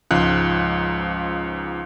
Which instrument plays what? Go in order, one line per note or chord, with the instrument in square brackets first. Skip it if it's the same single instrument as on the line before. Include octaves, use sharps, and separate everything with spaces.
[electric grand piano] C#2 G#2 F3 F#6